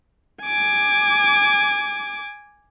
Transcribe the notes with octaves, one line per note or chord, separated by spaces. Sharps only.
G#5 D6